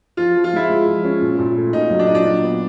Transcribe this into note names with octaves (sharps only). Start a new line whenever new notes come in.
F3 F4
F3
F4
G#3 E4
G#3
F3
C#4
A#2
A#2
A3
A#2 D#4
F#3
D4
A#2 D#4
D4
F#3
B3